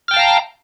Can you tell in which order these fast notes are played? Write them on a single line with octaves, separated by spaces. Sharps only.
F6 G5 A5 F5 A#5